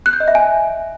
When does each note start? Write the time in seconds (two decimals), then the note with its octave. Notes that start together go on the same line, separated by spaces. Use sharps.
0.06 F#6
0.13 G6
0.20 D#5
0.28 E5
0.35 G#5